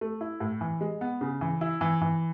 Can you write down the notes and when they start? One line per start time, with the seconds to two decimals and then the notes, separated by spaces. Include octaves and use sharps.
0.01 A3
0.21 E4
0.40 A2
0.61 E3
0.81 G#3
1.01 B3
1.21 C#3
1.41 E3
1.61 E4
1.81 E3
2.01 E3